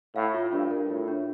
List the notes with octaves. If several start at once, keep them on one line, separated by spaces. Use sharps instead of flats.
A2 F5
F4
G2 D4
A#4
A2 F4
D4